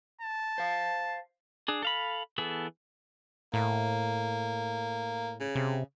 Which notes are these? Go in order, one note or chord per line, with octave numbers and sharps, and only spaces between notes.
A5
C5 F5
D4 G#4
A4 F5 B5
E3 B3 G#4 A4
A2 A#3
C#3
C3